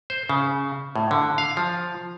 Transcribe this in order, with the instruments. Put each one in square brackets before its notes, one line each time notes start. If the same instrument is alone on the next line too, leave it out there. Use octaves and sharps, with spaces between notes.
[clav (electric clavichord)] C5
C#3
A2
D3
F5
F3